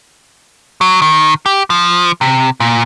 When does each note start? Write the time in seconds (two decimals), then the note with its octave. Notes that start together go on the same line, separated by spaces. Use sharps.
0.81 F#3
1.02 D#3
1.46 G4
1.70 F3
2.21 C3
2.60 A#2